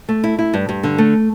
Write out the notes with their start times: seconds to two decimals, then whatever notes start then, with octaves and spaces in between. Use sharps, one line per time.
0.09 A3
0.24 E4
0.39 E4
0.54 G2
0.69 G2
0.83 D3
0.98 A3